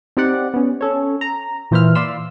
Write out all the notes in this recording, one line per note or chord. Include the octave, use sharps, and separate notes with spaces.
C4 D#4 G4 D5 F#5
B3 C#4
C#4 A4 C#5
A#5
A#2 E3 C5 E5 F6
D5 F5 B5 C6 E6